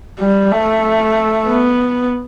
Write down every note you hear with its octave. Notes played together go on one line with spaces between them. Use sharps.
G3
A3
B3